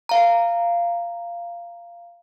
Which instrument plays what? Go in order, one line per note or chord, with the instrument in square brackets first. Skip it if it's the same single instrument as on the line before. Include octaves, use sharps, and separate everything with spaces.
[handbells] F5 A#5